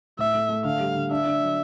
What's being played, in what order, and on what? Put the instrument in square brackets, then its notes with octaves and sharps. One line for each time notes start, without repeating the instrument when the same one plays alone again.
[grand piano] A2 [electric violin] E5
[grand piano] A3
A3
[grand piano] D3 [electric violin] F5
[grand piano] G3
D3
[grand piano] D4 [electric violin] E5
[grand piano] D4
F#3